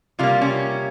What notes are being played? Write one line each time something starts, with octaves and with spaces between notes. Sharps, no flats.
C3 G3 A#3 F4
C#4